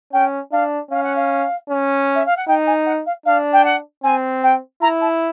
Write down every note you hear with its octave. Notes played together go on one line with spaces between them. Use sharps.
C#4 G5
D4 F5
C#4 F5
F#5
F5
C#4
E5
F5
F#5
D#4 G5
G#5
F#5
F5
D4 F5
G5
F#5
C4 G#5
G5
E4 A#5
A5